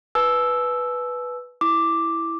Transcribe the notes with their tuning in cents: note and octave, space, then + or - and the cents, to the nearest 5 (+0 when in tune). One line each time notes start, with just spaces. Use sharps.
B4 +0 A5 -45 E6 +0
E4 -5 D6 +0